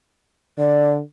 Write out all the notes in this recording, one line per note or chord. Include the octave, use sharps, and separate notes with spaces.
D3 D5